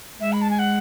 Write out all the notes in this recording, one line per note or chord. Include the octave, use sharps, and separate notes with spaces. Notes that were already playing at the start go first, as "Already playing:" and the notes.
G#3 E5
B5
A5
G#5
F#5